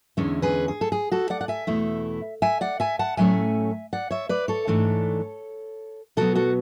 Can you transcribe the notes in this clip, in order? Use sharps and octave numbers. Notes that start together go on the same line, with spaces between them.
E2 D3 G#3 C#4 E4
G#4 B4
G#4
A4
G#4
F#4 A4
D5 F#5
F#5
E5 G#5
E2 B2 A3 E4
E5 G#5
D5 F#5
E5 G#5
F#5 A5
A2 F#3 A3 C#4 E5 G#5
D5 F#5
C#5 E5
B4 D5
A4 C#5
G#2 E3 A3 D4
B2 F#3 B3 F#4 A4
F#4 A4